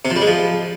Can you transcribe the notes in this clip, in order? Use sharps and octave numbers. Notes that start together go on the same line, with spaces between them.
C3
F3
G3
G#3
F3